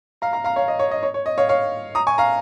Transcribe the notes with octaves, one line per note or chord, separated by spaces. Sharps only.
F5 A#5
F5 A#5
F5 A#5
C#5 F5
D#5
C#5
D#5
C#5
C#5
D#5
C#5 F5
C#5 F5
A#5 D#6
G#5 C#6
F5 A#5